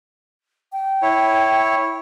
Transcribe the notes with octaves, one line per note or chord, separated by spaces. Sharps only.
G5
E4 C#5